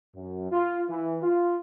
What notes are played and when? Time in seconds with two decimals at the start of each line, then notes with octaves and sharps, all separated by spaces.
0.16 F#2
0.52 F4
0.90 E3
1.23 F4